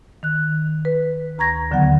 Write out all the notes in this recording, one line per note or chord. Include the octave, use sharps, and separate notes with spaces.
D#3 F#6
B4
D2 A#5 C#6 G#6 A#6
D#2 D3 D#3 F#3 B3 F#5